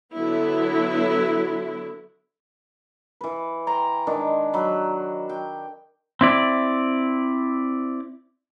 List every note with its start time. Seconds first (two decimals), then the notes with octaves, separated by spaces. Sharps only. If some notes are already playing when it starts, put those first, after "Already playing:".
0.14 D3 F#3 B3 E4
3.21 E3 B4
3.67 G5 G#5 A#5 C6
4.07 D#3 G#3 D4
4.53 F#3 B5
5.29 G5
6.21 C4 E4 D5